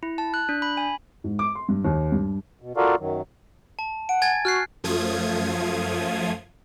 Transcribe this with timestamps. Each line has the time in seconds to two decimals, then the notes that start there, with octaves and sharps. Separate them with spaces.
0.03 E4
0.18 A5
0.34 F#6
0.49 D4
0.62 B5
0.77 G#5
1.24 G#2
1.39 D6
1.55 C6
1.69 G2
1.85 D#2
2.12 G2
2.61 B2
2.77 F4 F#4 A4 A#4 D5 F5
2.99 F#2 D#3 F#3
3.79 A5
4.09 F#5 D7
4.22 G#5 G#6 A6
4.45 F#4 F6 F#6 C7
4.84 F#2 F3 A3 F4 D#6 G#6